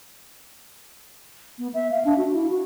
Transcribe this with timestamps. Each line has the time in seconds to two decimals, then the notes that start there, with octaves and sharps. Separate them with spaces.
1.59 B3
1.74 E5
1.91 F5
2.05 D4
2.18 F#4
2.34 E4
2.50 F#4